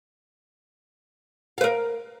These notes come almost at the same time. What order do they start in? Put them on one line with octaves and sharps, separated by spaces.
F5 B4 A#4